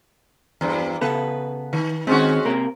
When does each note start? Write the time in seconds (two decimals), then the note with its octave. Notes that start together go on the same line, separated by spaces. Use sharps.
0.61 E2 G2
1.01 C#3 B3 A4 B4
1.73 D#3
2.07 D#3 G#3 C4 C#4 F#4
2.45 C3 A#3 A#4